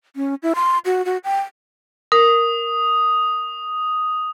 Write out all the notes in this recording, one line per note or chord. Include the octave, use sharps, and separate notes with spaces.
C#4
E4
C6
F#4
F#4
G5
A#4 D#6